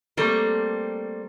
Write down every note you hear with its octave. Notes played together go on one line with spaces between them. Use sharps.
G3 A3 A#3 C4 A4 A#4